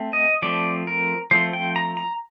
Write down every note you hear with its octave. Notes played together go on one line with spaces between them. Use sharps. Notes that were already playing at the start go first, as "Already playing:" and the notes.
Already playing: A3 C4
D#5
F3 A3 C4 D5
A#4
F3 A3 C4 C5
G5
A#5
A#5